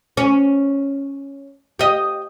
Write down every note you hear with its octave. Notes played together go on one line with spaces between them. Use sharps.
C#4
G4 D#5